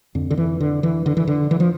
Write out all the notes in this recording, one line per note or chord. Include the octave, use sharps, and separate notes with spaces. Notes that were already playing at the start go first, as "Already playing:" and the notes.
F2 D3
D3
E3
D3
E3
D3
E3
D3
E3
F3